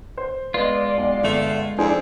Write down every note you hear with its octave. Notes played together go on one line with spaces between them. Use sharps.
C5
G#3 B3 F4 D5 D#5
B1
G1 A3 F7
F2 D4 E4 G#4 C5 D5